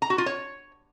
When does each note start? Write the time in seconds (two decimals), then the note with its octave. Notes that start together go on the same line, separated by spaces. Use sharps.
0.02 A#5
0.10 F#4
0.18 F4
0.26 C#5